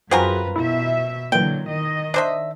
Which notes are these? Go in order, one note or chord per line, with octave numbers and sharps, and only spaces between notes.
F#2 C4 F4 F#4 G#4 A#4 B4
B2 E4 E5
A#2 D3 E3 F#3 G5
D#3 D#5
D4 C5 E5